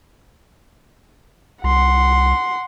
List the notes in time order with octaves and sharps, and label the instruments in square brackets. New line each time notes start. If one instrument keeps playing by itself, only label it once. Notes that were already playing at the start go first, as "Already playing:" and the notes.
[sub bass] C2 [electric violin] F#5 C6